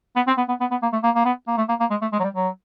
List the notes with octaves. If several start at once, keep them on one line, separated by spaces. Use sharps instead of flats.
B3
C4
B3
B3
B3
B3
A#3
A3
A#3
A#3
B3
A#3
A3
A#3
A#3
G#3
A3
G#3
F#3
G3
F#3